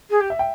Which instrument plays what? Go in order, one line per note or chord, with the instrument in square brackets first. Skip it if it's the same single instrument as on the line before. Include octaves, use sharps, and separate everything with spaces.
[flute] G#4
G4
[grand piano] E5
G5